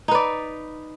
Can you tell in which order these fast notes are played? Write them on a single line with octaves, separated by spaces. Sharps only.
D#4 B4 D5